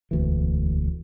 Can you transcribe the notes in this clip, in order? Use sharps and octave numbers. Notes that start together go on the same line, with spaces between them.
E1 D2 E3